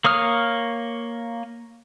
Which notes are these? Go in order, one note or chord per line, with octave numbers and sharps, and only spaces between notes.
A#3 C#5 D#6 F6